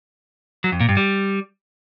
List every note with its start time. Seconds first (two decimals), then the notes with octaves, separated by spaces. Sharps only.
0.64 F#3
0.72 F2
0.80 A#2
0.89 G2
0.97 G3